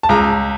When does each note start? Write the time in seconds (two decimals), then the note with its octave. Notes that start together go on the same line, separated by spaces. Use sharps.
0.03 A5
0.09 C#2 A#5